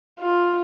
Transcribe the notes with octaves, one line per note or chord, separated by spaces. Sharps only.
F4